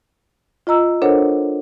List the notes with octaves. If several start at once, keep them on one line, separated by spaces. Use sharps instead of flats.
F4 D#5 A#5 E6
D4 A4 A#4 C5 C#5 F#5